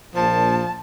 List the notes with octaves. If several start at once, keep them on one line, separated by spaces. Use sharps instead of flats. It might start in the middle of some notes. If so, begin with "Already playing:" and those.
A#1 A#2 F3 A5